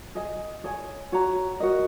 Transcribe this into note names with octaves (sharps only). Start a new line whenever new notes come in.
G#4 D#5 G#5
G#4 C#5 G#5
F#4 C#5 A#5
F#4 A#4 D#5